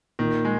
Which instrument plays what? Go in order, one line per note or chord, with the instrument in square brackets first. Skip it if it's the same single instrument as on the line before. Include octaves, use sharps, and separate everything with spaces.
[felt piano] A#2 [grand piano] D#3
[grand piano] G#3